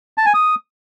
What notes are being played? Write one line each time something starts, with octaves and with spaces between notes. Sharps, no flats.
A5
G#5
D#6